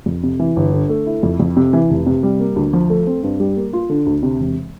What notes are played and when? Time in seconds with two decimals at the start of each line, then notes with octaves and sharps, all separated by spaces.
0.06 F2
0.23 C3
0.39 E3
0.56 G1
0.73 D3
0.89 A3
1.06 E4
1.23 F2
1.40 F2
1.57 C3
1.73 E3
1.90 F1
2.06 C3
2.23 G3
2.40 A#3
2.56 D2
2.73 F3
2.90 A3
3.07 C4
3.23 G2
3.40 G3
3.57 A#3
3.73 F4
3.89 D3
4.06 D2
4.23 C3
4.39 E1